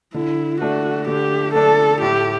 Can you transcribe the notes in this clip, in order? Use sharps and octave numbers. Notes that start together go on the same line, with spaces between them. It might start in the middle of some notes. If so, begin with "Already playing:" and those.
D3 E4
A3 D4 F#4
D3 G4
A3 D4 A4
A2 G4